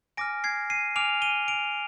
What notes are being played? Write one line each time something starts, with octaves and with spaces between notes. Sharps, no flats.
G#5 D6 F6 A#6 D7
G#6 C7
C7 D#7
G#5 D6 F6 D7 F7
D#7 G7
D7 F7